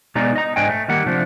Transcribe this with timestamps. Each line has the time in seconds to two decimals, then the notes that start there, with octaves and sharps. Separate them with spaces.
0.15 B2 G#3 D#4 D5 D#5 A#5
0.36 D#5 A#5
0.56 G#2 D4 D#5 G5 G#5
0.69 A3
0.88 D#3 G3 A#3 F#5
1.06 C3 F3 A3 D4